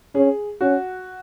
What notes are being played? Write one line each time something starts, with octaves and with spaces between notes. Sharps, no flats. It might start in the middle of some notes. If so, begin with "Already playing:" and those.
C#4 G#4
C#4 F#4